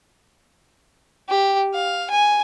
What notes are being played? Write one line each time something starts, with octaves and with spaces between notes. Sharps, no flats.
G4
F5
G#5